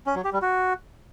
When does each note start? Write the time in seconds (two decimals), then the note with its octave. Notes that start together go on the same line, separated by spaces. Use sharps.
0.06 C#4
0.15 F#3
0.24 G4
0.33 G3
0.42 F#4